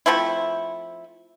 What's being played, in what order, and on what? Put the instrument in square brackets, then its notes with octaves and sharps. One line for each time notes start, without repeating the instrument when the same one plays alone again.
[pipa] F3 A3 C4 E4